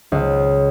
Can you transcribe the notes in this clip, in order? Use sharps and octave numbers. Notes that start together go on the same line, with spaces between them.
C#2